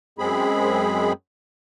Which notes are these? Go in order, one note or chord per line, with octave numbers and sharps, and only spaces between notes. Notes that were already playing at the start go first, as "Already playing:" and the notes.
F#2 G#3 C4 G#4 B5